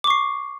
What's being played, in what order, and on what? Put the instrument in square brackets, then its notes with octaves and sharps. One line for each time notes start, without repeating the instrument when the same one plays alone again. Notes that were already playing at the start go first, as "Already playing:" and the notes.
[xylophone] D6
C#6
C7